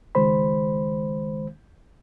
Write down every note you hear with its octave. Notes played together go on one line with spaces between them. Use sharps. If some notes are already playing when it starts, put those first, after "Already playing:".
C#2 D#3 G#3 C5 B5